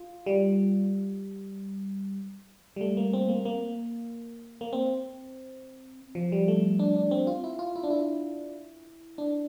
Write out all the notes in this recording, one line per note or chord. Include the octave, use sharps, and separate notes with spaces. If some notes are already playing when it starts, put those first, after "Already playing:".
Already playing: F4
G3
G3
A3
A#3
C4
A#3
A#3
A#3
C4
F3
G3
A3
D4
D4
C4
F4
E4
F4
E4
D4
E4
D4